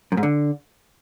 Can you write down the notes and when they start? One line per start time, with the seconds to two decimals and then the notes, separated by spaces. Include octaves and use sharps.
0.12 F#2
0.17 G#2
0.23 D3